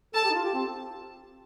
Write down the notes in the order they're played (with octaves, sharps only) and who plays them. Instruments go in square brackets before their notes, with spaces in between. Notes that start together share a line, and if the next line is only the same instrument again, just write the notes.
[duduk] A4 [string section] A5
[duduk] G4
D#4
F4
G4
C4